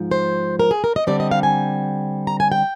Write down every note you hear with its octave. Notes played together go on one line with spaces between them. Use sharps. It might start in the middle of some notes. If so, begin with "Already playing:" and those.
Already playing: G#2 F3
C5
A#4
G#4
A#4
D#5
D3 G3 C4 D5
D#5
F5
G#5
A#5
G#5
G5